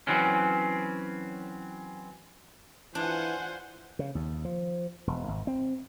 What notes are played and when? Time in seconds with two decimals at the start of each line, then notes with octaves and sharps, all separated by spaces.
0.07 E3 F#3 C4 C#4
2.95 E3 D4 F4 C5 F#5 G#5
3.99 C#3
4.15 D#2
4.45 F3
5.07 E1
5.28 G#1
5.47 C4